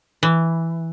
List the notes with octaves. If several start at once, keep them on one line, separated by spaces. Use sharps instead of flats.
E3